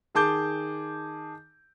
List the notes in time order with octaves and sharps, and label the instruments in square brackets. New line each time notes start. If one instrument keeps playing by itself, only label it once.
[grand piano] D#3 G#4 A5 D6 G6